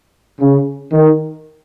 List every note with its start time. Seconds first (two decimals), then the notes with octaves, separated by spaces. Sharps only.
0.40 C#3
0.92 D#3